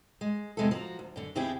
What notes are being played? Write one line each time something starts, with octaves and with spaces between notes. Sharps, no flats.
G#3
E2 C3 G#3 A3 E4 A4
F3 F#4 A#5
D2
F#2 D3
E2 C#3 C4 E4 G4 G#4